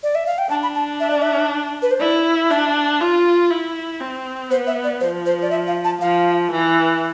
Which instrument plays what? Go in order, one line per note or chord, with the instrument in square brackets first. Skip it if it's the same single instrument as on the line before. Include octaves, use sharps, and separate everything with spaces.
[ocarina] D5
E5
F5
G5
[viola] D4 [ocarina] A5
[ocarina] B5
A5
E5
D5
E5
B4
C5
[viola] E4 [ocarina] D5
[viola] D4 [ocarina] E5
[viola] F4
E4
C4
[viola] B3 [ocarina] C5
[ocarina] E5
D5
[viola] F3 [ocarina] C5
[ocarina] C5
D5
E5
F5
A5
[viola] F3 [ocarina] F5
[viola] E3